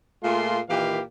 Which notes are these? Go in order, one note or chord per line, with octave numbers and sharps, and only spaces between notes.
A#2 A3 F4 G#4 C6
A#2 D#3 E3 G4 B4 F5